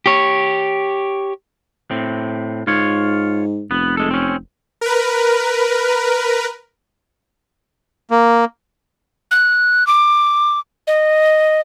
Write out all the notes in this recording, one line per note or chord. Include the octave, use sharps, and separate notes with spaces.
G4 C#5
A2 C4
G#2 F4 C#5
F1 B3
G#3 A4
C4 C#4
A#4 B4
A#3
F#6
D6
D#5